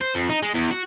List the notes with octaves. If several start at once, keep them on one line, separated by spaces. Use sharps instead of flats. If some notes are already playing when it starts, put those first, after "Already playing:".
C5
F2
D#4
G#3
E2
F#4